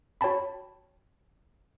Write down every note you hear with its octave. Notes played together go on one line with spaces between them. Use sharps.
F#4 C#5 G5 A5 B5